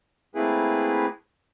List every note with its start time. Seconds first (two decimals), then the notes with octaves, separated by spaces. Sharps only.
0.35 A3 A#3 C4 E4 G#4 B4